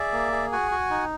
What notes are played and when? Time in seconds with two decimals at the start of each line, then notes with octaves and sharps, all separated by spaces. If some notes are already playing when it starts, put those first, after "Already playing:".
Already playing: G#4 D5 E5
0.13 A#3
0.32 G#4
0.52 F#4 F#5 G#5
0.71 F#4
0.91 D#4